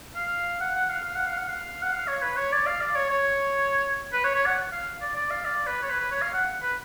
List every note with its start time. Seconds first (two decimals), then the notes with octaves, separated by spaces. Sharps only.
0.16 F5
0.60 F#5
0.75 F#5
0.90 F5
1.05 F5
1.16 F#5
1.27 F5
1.38 F#5
1.48 F5
1.82 F#5
1.93 F5
2.08 C#5
2.22 B4
2.37 C#5
2.52 D5
2.67 F5
2.81 D5
2.95 C#5
3.10 C#5
4.13 B4
4.24 C#5
4.35 C#5
4.46 F#5
4.72 F5
5.02 D5
5.16 D5
5.31 F5
5.45 D5
5.67 B4
5.83 C#5
5.90 B4
6.00 B4
6.12 C#5
6.22 F5
6.34 F#5
6.62 B4